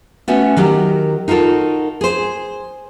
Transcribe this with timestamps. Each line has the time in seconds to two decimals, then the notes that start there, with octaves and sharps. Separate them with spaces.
0.28 A3 B3 C#4 F#4
0.56 D#3 F#3 G4 A#4
1.28 D#4 F4 F#4 A4 A#4
2.01 G#4 C5